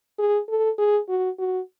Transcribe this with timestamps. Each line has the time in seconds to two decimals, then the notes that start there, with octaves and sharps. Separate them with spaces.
0.18 G#4
0.49 A4
0.78 G#4
1.09 F#4
1.39 F#4